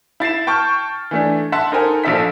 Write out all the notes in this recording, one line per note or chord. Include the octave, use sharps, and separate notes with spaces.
E4 A6 C7 E7
G5 A5 C#6 F6 G6
E3 A3 D4
E5 F#5 A5 C6
D#4 A4 A#4 C5 G5 G#5
A#1 F3 A4 E5 B6